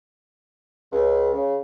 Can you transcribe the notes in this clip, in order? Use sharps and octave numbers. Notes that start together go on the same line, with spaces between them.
C#2
C#3